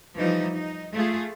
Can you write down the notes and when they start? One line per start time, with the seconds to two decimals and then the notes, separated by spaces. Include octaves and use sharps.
0.15 E3 F3 G3 D#4
0.54 D#4
0.93 A3 F4 G#4